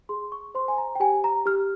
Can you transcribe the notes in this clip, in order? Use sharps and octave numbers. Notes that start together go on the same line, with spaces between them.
G#4 C6
C#6
C5 C6
G#5
A#5
G5
G4 G#5
A#5
G4 F6